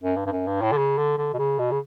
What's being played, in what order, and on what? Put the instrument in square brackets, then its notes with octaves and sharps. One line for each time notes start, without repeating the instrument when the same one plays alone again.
[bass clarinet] F#2
G2
G2
F#2
G2
A2
D3
C#3
D3
D3
B2
C#3
B2
C#3